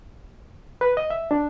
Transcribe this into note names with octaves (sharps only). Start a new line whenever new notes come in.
B4
D#5
E5
D4